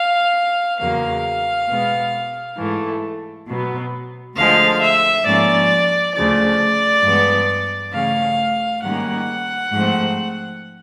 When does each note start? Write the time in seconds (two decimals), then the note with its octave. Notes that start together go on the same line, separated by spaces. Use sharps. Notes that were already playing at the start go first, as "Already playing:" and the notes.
Already playing: F5
0.79 E2 C#3 F#3 A#3 F5
1.69 B2 G#3 B3
2.57 G#2 E3 A3
3.47 B2 F#3 B3
4.36 D2 D3 F3 G#3 F5
4.80 E5
5.25 G#2 F3 A#3 C#4 D5
6.14 D2 C#3 F3 D5
7.03 G2 E3 G#3 B3
7.92 C#3 E3 A3 C#4 F5
8.82 G#2 D#3 G3 A#3 C#4 F#5
9.71 G#2 F3 A3 C4